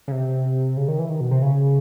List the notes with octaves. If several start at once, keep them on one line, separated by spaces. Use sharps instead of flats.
C#3
C3
C#3
D#3
E3
D#3
B2
C3
C#3